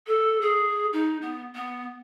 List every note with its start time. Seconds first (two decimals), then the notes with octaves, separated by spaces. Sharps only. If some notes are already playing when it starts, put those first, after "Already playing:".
0.07 A4
0.41 G#4
0.93 D#4
1.22 B3
1.55 B3